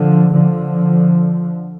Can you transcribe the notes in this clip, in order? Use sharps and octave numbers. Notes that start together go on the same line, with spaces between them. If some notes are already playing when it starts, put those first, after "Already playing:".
Already playing: D3 F3
D3 F3